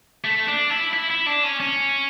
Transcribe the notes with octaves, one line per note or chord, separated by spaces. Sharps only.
A3
D4
E4
E4
E4
D4
C#4
C#4